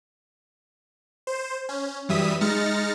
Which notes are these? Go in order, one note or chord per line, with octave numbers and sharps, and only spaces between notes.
C5
C#4
F#2 E3 G3 E5 D#6 B6
G#3 D#4 F6 A6 A#6 C#7